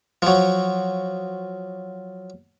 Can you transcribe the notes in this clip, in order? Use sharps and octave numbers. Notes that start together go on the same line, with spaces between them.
F3 F#3